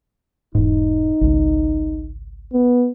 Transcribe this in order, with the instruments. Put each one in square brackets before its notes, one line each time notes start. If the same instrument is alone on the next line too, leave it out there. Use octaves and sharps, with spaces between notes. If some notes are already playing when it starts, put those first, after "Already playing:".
[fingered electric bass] E1 G#2 [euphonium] D#4
[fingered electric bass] G#1 C#2
[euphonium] B3